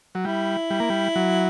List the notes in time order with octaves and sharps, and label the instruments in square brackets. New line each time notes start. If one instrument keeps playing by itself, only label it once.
[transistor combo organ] F#3
[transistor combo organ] G3 [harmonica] E4
[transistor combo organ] G3
A#3
G3
F#3